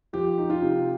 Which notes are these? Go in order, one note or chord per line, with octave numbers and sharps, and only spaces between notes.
F3 G4
D#4
F4
C3